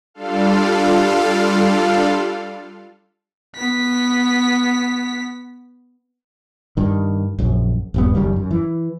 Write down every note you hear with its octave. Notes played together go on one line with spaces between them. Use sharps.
G3 D4 F4 A4 F5
B3 B6
G2 D#3
A#1 F#2
D#1 G2 B3
F#1 F#2 D#3 G3
F#2
E3